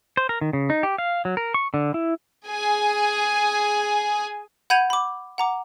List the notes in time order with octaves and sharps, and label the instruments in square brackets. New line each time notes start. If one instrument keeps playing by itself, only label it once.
[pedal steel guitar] C5
A#4
D#3
C#3
D#4
G4
F5
F#3
A#4
C#6
D3
E4
[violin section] G#4 G#5
[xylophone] F#5 B5 G6 G#6 D#7 F7
B5 D6
F#5 A#5 D6